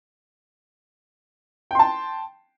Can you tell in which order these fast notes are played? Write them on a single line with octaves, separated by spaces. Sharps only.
G5 C6 A5